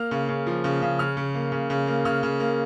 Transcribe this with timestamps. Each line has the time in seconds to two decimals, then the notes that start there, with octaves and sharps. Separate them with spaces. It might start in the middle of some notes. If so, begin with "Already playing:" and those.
Already playing: A#3 F6
0.11 C#3
0.29 C#3
0.46 F3
0.64 C#3
0.82 C#3
0.99 C#3 F6
1.17 C#3
1.35 A#3
1.52 C#3
1.70 C#3
1.87 A#3
2.05 C#3 F6
2.23 C#3
2.40 A#3